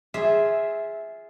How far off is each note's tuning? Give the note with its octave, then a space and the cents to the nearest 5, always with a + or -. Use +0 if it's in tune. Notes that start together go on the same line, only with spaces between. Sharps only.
F4 +0 G#4 +0 E5 -10